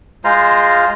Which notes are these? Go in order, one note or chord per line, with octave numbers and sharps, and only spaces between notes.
G#3 F4 C5 A#5